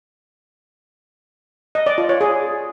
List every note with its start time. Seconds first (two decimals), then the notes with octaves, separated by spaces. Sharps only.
1.75 D#5
1.86 D5
1.98 F4
2.09 C#5
2.21 G#4